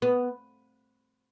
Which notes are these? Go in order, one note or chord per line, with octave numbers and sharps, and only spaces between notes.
B3